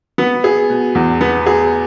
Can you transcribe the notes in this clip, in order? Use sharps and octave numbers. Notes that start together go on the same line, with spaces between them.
B3
G#4
B2
E2
B3
G#4